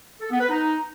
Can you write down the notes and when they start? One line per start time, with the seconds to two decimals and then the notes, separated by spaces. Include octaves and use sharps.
0.21 A4
0.30 B3
0.40 B4
0.50 D#4